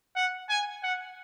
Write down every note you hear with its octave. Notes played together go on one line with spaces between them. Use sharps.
F#5
G#5
F#5